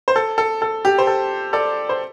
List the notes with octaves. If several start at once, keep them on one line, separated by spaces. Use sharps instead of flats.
C5
A4
A4
A4
G4
C5
A4
A4 D5
C5